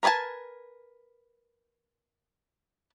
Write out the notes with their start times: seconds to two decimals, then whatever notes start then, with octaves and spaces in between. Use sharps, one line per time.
0.03 A#4 B4 D5 G#5 A5